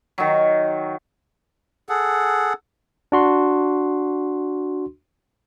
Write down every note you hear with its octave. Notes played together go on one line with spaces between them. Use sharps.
D#3 F#3
G#4 A4 F#5
D4 F#4 C6